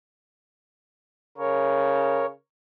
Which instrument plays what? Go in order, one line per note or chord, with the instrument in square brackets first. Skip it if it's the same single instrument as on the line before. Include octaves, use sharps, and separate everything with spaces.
[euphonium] C#3 [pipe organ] A#4 C#5